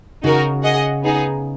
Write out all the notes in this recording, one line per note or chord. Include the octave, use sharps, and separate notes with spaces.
C#3 D#4 F#4 A#4
G#4 D#5 F#5
B3 D#4 G#4